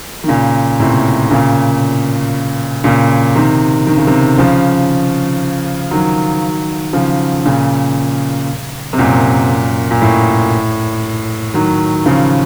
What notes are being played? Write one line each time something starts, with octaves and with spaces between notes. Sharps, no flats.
D#3
A#2 C#3
A2 C3
A#2 C#3
A#2 C#3
C3 D#3
D#3
C#3
C3 D#3
C#3 F3
D#3 F#3
C#3 F3
A#2 C#3
C3
F#2 A#2
A#2
A2
D#3 F#3
C#3 F3